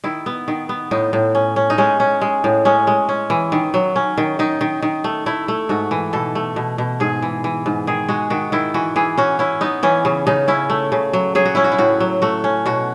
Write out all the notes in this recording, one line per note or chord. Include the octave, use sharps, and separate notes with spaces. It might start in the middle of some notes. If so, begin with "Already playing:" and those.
D#3 E4
B3
D#3
B3
A2 D#4
A2
C#4
C#4
D#4
G#3 C#4
C#4
G#3
A2
G#3 C#4
G#3
C#4
E3
D#3
F#3
C#4
D#3
D#3 D#4
D#3
D#3
A3
A3 E4
A3
G#2 F#4
E3
B2 A4
A3
B2
B2
G#2 G#4
E3
E3
G#2
D#3 G#4
G#3 F#4
D#3 F#4
D#3 E4
E3 F#4
E3 G#4
C#4 F#4
C#4 E4
B3 D#4
E3 C#4
C#3
C#3 D#4
C#4 E4
A3
C#3
F#3
F#3 G#4
F#4
C#4 E4
F#4
E4
A2 F#4
F#3
A3 F#4
C#4
B2 F#4